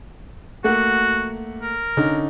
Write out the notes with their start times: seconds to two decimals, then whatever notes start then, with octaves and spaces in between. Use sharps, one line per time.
0.64 A3 A#3 F#4 F#5
1.62 A#4
1.97 D3 C#4 D#4